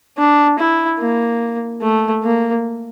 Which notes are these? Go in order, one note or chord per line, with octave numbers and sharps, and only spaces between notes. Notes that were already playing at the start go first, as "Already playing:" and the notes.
D4
E4
A#3
A3
A#3